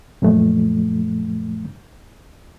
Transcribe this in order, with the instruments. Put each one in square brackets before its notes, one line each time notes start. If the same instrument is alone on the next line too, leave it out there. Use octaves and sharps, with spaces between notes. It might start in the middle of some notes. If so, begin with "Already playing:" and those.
[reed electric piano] F#2 A#2 F3 A3